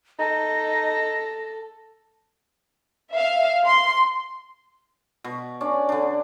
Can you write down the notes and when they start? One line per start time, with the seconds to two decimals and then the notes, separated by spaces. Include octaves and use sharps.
0.19 D#4 A4 A#6
3.14 E5 F5
3.66 C6
5.24 B2
5.61 C#4 D4 D5
5.89 D3 D4